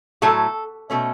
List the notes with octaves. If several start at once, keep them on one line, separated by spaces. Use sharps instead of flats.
A2 F#3 A3 A4
B2 A3 C#4